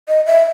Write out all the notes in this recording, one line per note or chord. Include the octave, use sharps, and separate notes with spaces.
D#5
E5